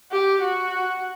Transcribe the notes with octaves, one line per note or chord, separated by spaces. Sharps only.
G4
F#4